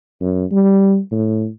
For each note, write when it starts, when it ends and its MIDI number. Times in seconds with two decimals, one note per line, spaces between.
0.21 0.45 42
0.51 0.98 55
1.11 1.48 45